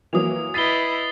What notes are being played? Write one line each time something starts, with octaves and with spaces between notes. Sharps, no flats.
E3 F#3 A#3 D#6 F7
E4 B4 D#5 A6 B6 C7 D#7 G7